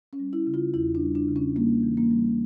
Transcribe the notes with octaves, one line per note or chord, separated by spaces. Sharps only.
C#4
G3
E4
C#3
F4
E2 E4
D4
G3
D4
C#3
C#4
G3 A#3
E3
A#3
G3